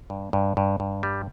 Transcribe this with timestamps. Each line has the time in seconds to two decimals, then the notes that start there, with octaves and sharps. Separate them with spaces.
0.10 G2
0.33 G2
0.57 G2
0.80 G2
1.03 G3